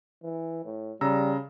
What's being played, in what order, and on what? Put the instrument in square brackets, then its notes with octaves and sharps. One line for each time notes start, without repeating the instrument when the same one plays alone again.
[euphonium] E3
A2
[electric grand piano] C#3 A#5 E6 [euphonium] G3